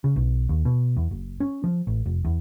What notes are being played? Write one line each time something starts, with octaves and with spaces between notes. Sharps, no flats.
C#3
B1
D#2
B2
E2
F#1
C#4
F3
A1
F1
E2